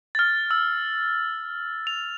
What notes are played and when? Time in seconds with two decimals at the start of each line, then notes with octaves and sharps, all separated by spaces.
0.15 F6 A6
0.51 E6
1.87 F7